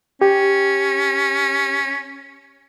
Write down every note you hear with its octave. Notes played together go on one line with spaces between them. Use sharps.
C#4 G4